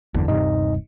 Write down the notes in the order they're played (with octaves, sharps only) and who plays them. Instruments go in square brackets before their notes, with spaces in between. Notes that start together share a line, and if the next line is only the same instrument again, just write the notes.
[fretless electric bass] F#1 E2 D3
[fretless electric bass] D#1 G2 C3 [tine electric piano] D#4 D#5